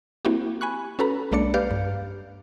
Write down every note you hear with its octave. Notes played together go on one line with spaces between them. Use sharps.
A#3 C4 E4 F#4 G4
G#5 B5 C#6 F#6
C#4 F#4 A4 B4 A#5 B5
B1 G#3 A#3 D4 D5 C#7
G4 B4 D5 F5 F6 G6
G2